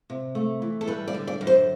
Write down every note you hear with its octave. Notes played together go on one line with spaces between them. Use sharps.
C3
A3
E3
A4
G3 B4
D5
D3
D5
F#2
C5